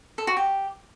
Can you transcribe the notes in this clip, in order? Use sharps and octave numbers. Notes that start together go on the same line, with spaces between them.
A4
F#4
G4